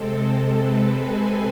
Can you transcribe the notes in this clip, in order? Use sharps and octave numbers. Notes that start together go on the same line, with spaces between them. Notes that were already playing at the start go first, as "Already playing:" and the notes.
Already playing: C3 G#3 C4 A4
B4
G#5